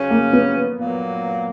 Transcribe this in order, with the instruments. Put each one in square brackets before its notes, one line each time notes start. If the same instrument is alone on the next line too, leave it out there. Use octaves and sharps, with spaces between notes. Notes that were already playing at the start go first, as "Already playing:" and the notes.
Already playing: [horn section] C#3 F#3 C#4
[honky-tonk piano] A#3
B3
[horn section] A#2 F#3 A#3